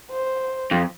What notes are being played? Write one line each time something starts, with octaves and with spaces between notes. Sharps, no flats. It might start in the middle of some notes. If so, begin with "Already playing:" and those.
C5
F2